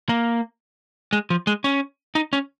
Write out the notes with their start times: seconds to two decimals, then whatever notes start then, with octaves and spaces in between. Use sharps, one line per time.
0.09 A#3
1.13 G#3
1.30 F3
1.47 G#3
1.64 C#4
2.15 D#4
2.33 C#4